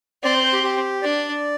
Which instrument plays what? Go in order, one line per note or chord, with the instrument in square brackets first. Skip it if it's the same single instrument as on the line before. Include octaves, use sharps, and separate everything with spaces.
[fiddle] C4 [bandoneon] D5
[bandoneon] C5
C5
G4
G4
[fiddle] D4 [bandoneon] D5